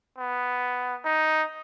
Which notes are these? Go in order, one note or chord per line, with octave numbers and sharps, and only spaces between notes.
B3
D#4